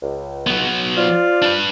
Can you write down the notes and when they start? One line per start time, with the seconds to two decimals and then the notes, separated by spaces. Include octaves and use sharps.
0.01 C#2
0.47 F#3 B3
0.97 F4 C5 D5
1.42 D4 B4